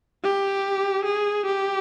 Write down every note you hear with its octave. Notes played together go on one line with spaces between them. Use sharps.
G4
G#4
G4